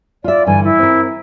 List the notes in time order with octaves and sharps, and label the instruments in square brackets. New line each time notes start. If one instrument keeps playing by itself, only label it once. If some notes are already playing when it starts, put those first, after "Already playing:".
[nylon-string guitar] F4 E5 [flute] D5
[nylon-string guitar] G2 D3 E3 [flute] G#5
[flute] E4
[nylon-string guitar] C4 A#4